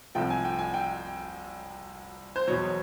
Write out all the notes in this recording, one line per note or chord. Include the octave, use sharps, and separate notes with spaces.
C2 C3 F3 A3 G5
G#5
G5
G#5
G5
C5
E2 B2 F#3 C#5